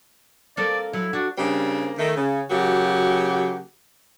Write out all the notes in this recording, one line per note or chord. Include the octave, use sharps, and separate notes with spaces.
A#3 C4 A4 D5
F#3 E4
D4 F#4
C#3 G3 A#3 C4 D4
D#3 A3
C#3
C#3 F#3 A#3 F#4 G4